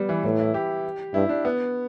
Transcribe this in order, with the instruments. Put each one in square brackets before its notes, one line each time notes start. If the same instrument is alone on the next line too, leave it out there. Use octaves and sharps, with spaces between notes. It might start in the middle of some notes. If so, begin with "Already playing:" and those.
Already playing: [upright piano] G3 B3
E3
[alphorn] A2 [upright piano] E3
[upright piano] E4
G4
[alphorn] G2 [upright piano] E4
[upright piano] D4
B3